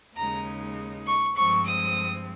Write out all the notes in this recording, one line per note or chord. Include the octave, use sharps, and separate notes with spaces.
D#2 C#3 G#3 D#4 A#5
C#6
G2 F3 G#3 C4 C#6
D#6